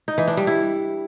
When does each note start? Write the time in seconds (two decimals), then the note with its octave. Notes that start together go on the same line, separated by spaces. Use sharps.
0.08 D#4
0.18 E3
0.27 D4
0.37 G3
0.47 E4